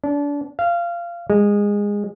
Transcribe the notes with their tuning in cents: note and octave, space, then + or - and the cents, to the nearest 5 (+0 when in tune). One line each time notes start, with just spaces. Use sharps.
D4 -30
F5 -20
G#3 -20